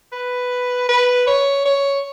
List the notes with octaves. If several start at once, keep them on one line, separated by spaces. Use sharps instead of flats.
B4
B4
C#5
C#5